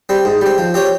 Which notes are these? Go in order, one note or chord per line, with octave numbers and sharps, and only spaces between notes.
G3 C4
G#2
G3 C4
F3
C4 G4 C#5